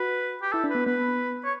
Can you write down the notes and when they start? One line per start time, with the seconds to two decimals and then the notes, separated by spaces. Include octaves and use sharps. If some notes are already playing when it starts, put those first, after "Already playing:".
Already playing: F#4 B4
0.42 G4
0.53 E4 A4
0.64 D4
0.70 B3 B4
0.86 B3 B4
1.45 C#5